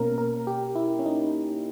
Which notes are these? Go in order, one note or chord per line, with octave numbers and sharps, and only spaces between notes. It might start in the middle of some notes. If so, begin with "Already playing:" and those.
Already playing: B2 A#3 C#4 A#4
A#4
G4
E4
C#4
D#4